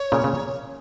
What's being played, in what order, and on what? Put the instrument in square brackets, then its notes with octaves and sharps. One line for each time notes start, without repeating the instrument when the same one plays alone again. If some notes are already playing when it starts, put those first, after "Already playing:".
Already playing: [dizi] C#5
[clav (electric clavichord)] A#2 C#3
C#3